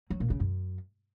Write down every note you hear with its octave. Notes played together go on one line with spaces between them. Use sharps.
F#3
A#2
C#3
F#2